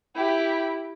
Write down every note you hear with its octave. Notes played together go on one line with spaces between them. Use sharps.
E4 G4